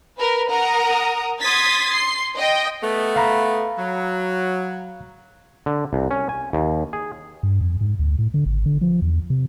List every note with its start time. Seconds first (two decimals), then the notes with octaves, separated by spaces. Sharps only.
0.18 A#4 B4
0.50 A#4 F#5 A#5 D#6
1.40 C6 D#6 G#6 A6 B6
1.92 C6 C7
2.36 D#5 G5
2.83 A3 B3
3.16 F5 A#5 B5
3.78 F#3
5.66 D3
5.93 C2
6.11 C#4
6.29 G#5
6.53 D#2
6.93 G#4
7.43 G2
7.61 F2
7.81 G#2
7.99 D2
8.19 A2
8.34 D3
8.46 G#1
8.66 D3
8.81 F3
9.02 E2
9.30 C3